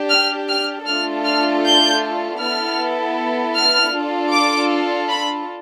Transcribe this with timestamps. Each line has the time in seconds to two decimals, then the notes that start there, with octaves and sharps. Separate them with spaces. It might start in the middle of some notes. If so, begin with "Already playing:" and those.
Already playing: D4 G4
0.10 F6
0.48 F6
0.87 A3 D4 F4 A4 F6
1.25 F6
1.64 G6
2.40 B3 E4 A4 F6
3.56 F6
3.94 D4 F4 A4
4.32 D6
5.09 B5